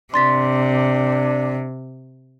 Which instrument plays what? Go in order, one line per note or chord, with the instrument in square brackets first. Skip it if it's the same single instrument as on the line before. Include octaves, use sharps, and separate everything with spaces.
[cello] C3 [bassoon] D4 [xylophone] C6 A6 B6